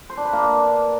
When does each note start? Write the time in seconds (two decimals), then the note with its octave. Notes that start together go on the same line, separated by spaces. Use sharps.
0.10 C5
0.17 D4
0.25 B4
0.33 A#3